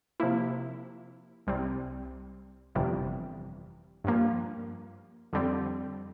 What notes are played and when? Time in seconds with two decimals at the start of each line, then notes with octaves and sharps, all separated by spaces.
0.20 C3 F3 A#3 E4
1.47 C2 C3 G3 C4
2.75 G1 F2 C3 E3 G3
4.04 G2 F3 A#3
5.33 F2 D3 G3 C4